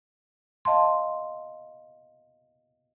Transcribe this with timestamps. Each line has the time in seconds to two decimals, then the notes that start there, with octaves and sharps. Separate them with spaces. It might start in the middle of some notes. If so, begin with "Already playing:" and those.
0.65 D#5 F5 A5 C6